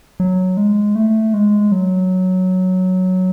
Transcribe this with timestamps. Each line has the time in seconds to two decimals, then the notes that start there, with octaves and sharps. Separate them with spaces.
0.20 F#3
0.57 G#3
0.95 A3
1.34 G#3
1.72 F#3